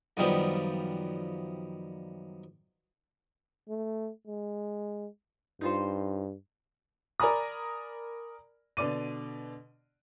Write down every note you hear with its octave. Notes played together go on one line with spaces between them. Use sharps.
F#2 D#3 F3 G3 B3
A3
G#3
G2 D#4 F4 C5
A#4 D5 G#5 A#5 B5 D#6
B2 D3 D5 D6 D#7